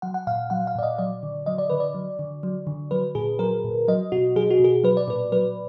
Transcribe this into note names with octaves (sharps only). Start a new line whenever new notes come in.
F#3 F#5
F#5
A#2 F5
F#3 F#5
F5
A#2 D5
D#5
F#3 D5
D3
F#3 D#5
D5
D3 B4
D5
F#3
D3
F#3
D3
F#3 B4
A#2 G#4
F#3 A#4
A#2
F#3 D#5
B2 F#4
F#3 G#4
F#4
B2 G#4
F#3 B4
D5
A#2 B4
F#3 B4